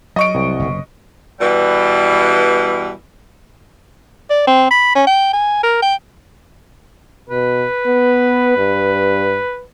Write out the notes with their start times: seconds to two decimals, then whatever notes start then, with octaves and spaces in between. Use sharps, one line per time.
0.16 F#3 D#5 C#6 D7
0.35 C2
0.60 F#1 C3
1.40 B2 E3 G3
4.30 D5
4.47 C4
4.70 B5
4.95 C#4
5.07 G5
5.33 G#5
5.63 A#4
5.82 G5
7.30 B2 B4
7.87 B3
8.58 G2